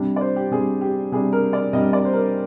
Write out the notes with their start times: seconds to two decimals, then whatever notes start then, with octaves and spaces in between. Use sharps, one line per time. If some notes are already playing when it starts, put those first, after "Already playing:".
Already playing: C3 G3 D4
0.16 D5
0.21 C5
0.36 G4
0.51 C3 G3 D4 G#4
0.81 G4
1.12 C3 G3 D4 G#4
1.33 A#4
1.53 D5
1.73 C3 G3 D4 D#5
1.93 D5
2.05 C5
2.13 A#4